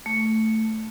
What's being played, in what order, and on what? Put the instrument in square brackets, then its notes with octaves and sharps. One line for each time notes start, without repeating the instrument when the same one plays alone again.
[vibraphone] A3